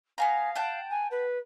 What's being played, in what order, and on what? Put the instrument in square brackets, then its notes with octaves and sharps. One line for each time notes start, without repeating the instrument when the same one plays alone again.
[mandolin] B3 G#5 A#5 [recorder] F5
[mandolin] F#5 G5 A5
[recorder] G#5
B4